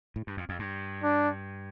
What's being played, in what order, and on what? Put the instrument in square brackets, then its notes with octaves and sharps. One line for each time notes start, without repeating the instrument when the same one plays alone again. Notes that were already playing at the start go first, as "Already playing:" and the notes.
[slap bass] A2
G2
F2
F2
G2
[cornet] D4